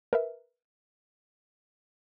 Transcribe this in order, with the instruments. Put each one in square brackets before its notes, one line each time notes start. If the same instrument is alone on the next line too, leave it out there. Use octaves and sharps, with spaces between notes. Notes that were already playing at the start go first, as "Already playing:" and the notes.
[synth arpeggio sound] A#4 B4 E5